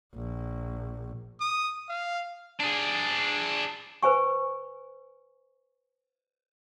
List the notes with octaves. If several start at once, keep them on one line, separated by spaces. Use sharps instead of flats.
A#1
D#6
F5
D4 G#4
B4 C5 G#5 C#6